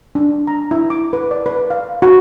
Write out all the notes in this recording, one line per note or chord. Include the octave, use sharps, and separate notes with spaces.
D4
A#5
E4
D6
B4
D5
B4
F5
F#4